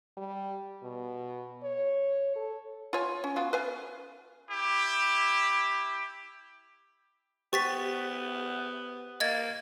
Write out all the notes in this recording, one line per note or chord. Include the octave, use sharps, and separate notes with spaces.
G3
B2
C#5
A4
F4 C#5 G#5
C#4
B3 F4 F#4
B4 F5 G#5
E4 G4
B3 G4 C5 C#6 A6 B6
A#3 D#5 G#6 A6